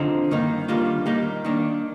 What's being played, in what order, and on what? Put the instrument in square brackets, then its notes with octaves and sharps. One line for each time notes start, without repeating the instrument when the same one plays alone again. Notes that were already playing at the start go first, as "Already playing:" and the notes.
Already playing: [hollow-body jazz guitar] D3 F3 C4 D#4
G2 D#3 A#3 D#4
D#2 D3 G3 A#3 F4
G3 A#3 D#4 G4
D#3 A#3 D4